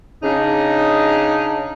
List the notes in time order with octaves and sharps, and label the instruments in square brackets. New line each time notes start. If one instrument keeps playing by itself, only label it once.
[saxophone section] C#3 D4 D#4